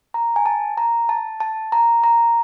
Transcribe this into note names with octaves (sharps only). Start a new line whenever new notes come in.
A#5
G#5
A5
A#5
A5
A5
A#5
A#5